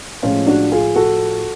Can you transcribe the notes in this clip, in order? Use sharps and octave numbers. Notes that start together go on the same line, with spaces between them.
A2 F3 G#3 C#4 F4
D4 F#4
F4 G#4
F#4 A4